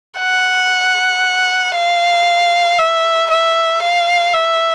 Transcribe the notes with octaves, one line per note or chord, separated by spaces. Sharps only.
F#5
F5
E5
E5
F5
E5